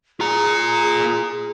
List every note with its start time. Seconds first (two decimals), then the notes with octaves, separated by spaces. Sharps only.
0.20 F4 G#4 A#5